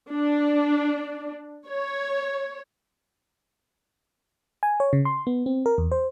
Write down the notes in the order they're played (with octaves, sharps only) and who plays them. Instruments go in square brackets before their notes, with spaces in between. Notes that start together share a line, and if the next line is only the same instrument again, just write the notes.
[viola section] D4
C#5
[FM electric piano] G#5
C#5
C#3
C6
B3
C4
A#4
E2
C5